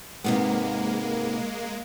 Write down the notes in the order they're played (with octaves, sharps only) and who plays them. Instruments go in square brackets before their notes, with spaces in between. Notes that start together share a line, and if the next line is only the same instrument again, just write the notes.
[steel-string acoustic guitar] G#2 C3 B3 [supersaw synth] G#3 A#3